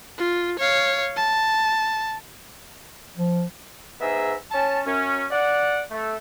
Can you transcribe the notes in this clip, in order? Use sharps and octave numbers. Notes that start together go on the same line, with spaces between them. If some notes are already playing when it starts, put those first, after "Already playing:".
F4
C#5 F5
A5
F3
G#2 B3 G#4 E5 A#5 E6
C#4 C#5 G#5 A5
F#2 C#4
D5 F#5
A3